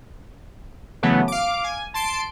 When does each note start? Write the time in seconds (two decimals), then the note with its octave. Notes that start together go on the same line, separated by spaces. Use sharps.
1.03 C#3 E3 F#3 A3 B3
1.28 F5 D6
1.64 G#5
1.94 A5 C6 D7